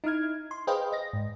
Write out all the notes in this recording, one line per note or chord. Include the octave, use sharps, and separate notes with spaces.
D#4 E4 F6 G#6
C6
G#4 B4 C5 D#5 F5 G5
D#5 A#6
G#2